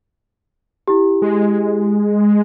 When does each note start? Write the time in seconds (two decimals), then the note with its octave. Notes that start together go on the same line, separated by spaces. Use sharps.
0.88 E4 G4
1.22 G#3